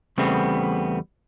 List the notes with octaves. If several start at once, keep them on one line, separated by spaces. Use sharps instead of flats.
E2 C#3 G3 A3 B3 C4